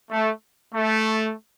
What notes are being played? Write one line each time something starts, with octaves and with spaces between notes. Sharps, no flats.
A3
A3